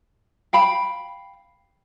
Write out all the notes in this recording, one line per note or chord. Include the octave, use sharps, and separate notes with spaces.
F5 G5 B5